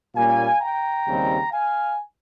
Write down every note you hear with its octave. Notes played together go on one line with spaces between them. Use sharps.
A#2 G3 A#3 C#4 F5 G#5
G5 A#5
D#2 C#3 G3 C4 D#4
F5 G#5